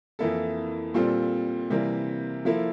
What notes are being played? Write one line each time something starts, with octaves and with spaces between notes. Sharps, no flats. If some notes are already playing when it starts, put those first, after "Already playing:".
F2 E3 A#3 E4 A4
A#2 G3 C4 F4 A4
C3 E3 G3 A#3
F3 A#3 E4 A4